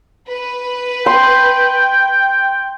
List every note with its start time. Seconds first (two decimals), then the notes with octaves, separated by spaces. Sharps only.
0.29 B4
1.06 G5 C6